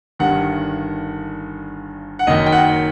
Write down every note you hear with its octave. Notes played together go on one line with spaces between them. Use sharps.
G1 G2 D#3 F#5
F#5
F#1 F#2 D#3 D#5
G5
F#5